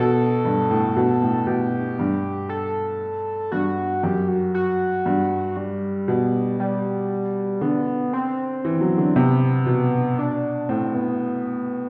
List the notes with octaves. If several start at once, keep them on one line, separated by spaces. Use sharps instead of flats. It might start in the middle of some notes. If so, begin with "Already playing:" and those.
Already playing: B2 A4
G2
A2
B2
A2
B2 G4
G2
A4
G2 F#4
F#2 G4
F#4
F#4
G2
G3
B2
G3
D3 B3
C4
E3
F#3
D3
C3 B3
B2
D4
A2 C4
B3